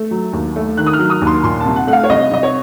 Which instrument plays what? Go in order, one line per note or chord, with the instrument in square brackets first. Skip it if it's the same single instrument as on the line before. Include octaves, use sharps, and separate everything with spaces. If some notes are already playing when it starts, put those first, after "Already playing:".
Already playing: [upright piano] A3
F#3
D#2
A3
D#3 F#6
D#6
F6
F#3
D#6
D#2
C6
A#2 C6
A5
C2
F#5
A3 F#5
F5
C#5
C2 D#5
C2 D#5
C#5